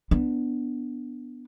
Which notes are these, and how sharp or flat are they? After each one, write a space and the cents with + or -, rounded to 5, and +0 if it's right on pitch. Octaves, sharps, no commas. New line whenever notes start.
B3 +0 D4 +0